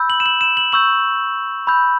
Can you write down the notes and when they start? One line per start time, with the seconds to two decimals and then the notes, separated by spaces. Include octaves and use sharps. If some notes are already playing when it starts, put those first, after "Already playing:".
Already playing: B5 E6 G6
0.10 F#7
0.20 E7
0.26 F#7
0.41 E7
0.57 F#7
0.72 C#6 E6 G6 F#7
1.67 B5 E6 G6